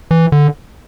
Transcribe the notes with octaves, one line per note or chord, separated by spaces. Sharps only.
E3
D3